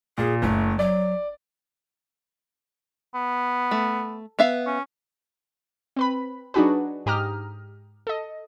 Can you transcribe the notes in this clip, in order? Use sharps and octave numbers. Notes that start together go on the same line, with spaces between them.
A#2 G#4
F#1 A3
F#3 D5
B3
A3
B3 E5 F5
C#4
C4 B4 B5
F#3 D4 D#4 F#4 G#4 B4
G#2 G4 A#5 D#6 F6
A4 D#5